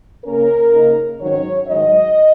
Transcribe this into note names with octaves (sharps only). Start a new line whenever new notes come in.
C#3 A#3 C#4 A#4
C#3 A#3 D#4
G#2 D#3 F#3 C#4 C#5
G#2 D#3 F#3 D#4 D#5